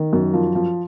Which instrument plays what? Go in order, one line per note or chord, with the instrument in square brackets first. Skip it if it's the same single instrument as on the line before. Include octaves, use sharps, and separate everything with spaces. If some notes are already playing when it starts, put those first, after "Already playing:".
Already playing: [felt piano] D#3
F#2
F3
F3